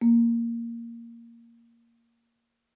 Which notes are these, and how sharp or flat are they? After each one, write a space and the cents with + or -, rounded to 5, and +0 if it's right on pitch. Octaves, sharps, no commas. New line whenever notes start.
A#3 -5